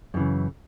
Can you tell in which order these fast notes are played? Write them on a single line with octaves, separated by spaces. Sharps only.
F#2 E3 C#3